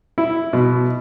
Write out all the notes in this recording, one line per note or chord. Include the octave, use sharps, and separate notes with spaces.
E4
B2